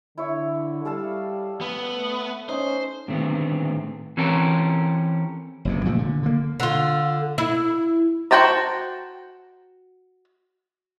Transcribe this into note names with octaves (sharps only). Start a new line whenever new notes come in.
D3 E4 C#5
G3 A4 F5 A5
B3
A3
C#4 D#4 C5
A2 D3 D#3 A3 B3 C4
E3 C4 C#4 G4 A4 A#4
F#1 E2 C3
A#2 F3 A3
D3
D3 A#3
D3 F4
E4
F#4 C5 G5 A5 A#5